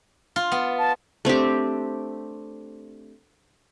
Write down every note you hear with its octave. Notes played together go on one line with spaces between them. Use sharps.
F4
B3
A5
A3 C4 D4 G4